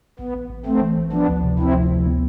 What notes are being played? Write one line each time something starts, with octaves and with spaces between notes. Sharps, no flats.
A1 B3
A1
A1
A1 A3 C4
E3
A1
F3 B3 D4
D2
C3
D2 C4 E4
F3
D2
B3